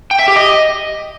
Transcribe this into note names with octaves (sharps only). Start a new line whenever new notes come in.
G5
E5
G4
D#5